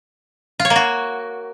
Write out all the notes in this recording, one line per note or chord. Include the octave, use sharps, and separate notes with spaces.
F4
C#5
A#3
F#4